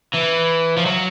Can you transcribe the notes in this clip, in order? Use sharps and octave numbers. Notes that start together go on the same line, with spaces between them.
E3
F3
F#3